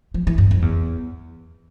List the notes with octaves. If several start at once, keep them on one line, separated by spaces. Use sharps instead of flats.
F3
E3
G2
F2
E2